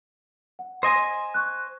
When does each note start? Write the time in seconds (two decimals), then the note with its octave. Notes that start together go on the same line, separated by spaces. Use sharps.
0.59 F#5
0.83 C5 D#5 G#5 C6 D#6 A#6
1.34 C#6 F#6